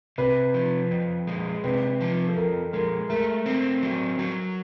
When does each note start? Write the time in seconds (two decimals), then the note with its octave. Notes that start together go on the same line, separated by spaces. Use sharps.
0.18 C3 B4
0.54 F3
0.91 F2
1.27 G#3
1.64 C3 B4
2.01 F3
2.29 A4
2.36 F2 A#4
2.72 G#3 A#4
3.09 A3 A#4
3.46 C4
3.83 F#3
4.19 F#3